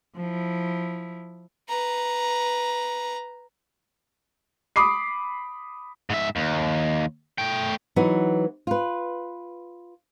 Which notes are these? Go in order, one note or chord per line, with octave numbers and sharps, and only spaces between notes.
F3 E4
B4 A#5
B5 D6 D#6 C7
G#2 E5
D#2
A3 G5
E3 F#3 B3 D#4
F4 B4